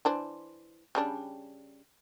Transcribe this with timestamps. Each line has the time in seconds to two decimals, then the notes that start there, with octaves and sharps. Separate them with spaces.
0.05 E3 D4 C5
0.95 C#3 G3 D4